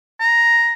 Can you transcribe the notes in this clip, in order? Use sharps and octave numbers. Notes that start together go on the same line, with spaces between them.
A#5